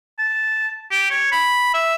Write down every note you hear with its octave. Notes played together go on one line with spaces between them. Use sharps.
A5
G4
C#5
B5
E5